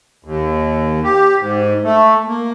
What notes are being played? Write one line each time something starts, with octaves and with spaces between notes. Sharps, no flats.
D#2
G4
G#2
A3
A#3